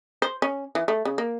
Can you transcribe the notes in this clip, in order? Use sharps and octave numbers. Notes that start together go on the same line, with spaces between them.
C5
C#4
E3
A3
C#3
A#3